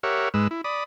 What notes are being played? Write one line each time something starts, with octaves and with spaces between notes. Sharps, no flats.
G4 A#4 C#5 E5 F#5
G#2 G#3 B4 E6
E4
D5 B5 D#6